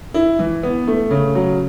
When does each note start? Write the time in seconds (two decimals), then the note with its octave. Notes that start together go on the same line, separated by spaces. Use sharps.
0.14 E4
0.39 E3
0.63 B3
0.87 A3
1.11 C#3
1.35 F#3